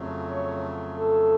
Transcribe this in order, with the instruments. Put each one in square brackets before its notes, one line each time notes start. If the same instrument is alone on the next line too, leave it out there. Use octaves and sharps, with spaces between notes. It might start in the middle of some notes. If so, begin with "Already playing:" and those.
Already playing: [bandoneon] F2 C#3 F#3 A3
[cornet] C#5
A4